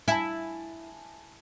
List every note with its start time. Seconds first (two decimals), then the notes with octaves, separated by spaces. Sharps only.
0.08 E4 G#5 A5